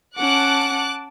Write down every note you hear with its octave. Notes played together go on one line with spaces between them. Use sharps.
C#4 F#5 A5 D6 F#6